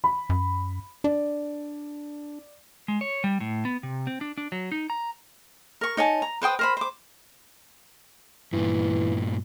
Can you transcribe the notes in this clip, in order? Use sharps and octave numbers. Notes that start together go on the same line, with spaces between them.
B5
F#2
D4 D5
G#3
C#5
G3
A2
B3
C3
C4
D4
D4
F#3
D#4
A#5
A#4 C#6
D#4 C#5 G#5 A5
A#5
B4 C5 G5 D#6
A#4 C5 B5
C5 D6
G2 A#2 E3